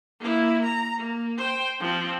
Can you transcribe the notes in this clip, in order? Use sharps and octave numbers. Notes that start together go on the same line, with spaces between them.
A#3 E4
A#5
A#3
C5 G5
F3 C4